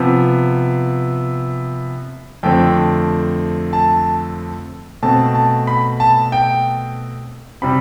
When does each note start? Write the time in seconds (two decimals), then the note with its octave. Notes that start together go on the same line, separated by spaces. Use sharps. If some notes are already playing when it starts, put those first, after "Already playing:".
Already playing: C3 F3 B3
2.43 F2 D3 A3 C4 G5
3.73 A5
5.03 B2 A3 C4 A5
5.35 A5
5.67 B5
6.00 A5
6.32 G5
7.62 C3 G3 C4 B5